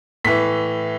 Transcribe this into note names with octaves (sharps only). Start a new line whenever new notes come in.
A2 E3 B6